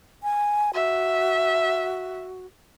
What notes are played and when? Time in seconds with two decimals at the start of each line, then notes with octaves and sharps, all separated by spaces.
0.23 G#5
0.74 F#4 E5